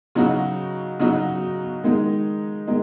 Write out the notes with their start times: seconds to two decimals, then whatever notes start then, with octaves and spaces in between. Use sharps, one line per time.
0.15 C#3 F#3 D#4 F#4
0.99 C#3 F#3 D#4 F#4
1.83 D#3 G#3 D#4
2.67 D#3 G#3 D#4